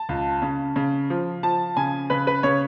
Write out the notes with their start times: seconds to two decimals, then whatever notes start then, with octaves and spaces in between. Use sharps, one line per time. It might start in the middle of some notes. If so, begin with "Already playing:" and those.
Already playing: A5
0.09 C#2
0.42 C#3
0.76 C#3
1.10 F3
1.43 F3 A5
1.77 C#3 G#5
2.10 C#3 B4
2.27 B4
2.43 C#3 C#5